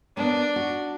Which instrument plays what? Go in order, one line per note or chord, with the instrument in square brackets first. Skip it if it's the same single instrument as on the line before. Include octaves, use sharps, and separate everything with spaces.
[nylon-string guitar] A#3 B3 [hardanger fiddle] D4
[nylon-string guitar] F#4